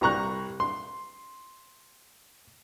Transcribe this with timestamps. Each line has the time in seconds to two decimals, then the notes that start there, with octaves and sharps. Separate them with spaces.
0.01 C2 G3 A#5 C#6 F#6
0.60 C6